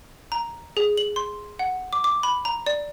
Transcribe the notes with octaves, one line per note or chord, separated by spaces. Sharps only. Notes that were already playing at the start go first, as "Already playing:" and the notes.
A#5
G#4
F#7
C6
F#5
D6
D6
B5
A#5
D5